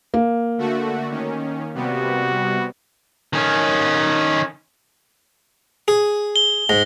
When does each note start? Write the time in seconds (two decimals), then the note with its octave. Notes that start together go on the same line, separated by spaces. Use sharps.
0.14 A#3
0.58 D3 A3 F#4
1.11 D#3 C#4
1.74 C3 G3 B3 F#4
3.33 D#3 C#4
5.88 G#4
6.36 G7
6.69 G#2 A#6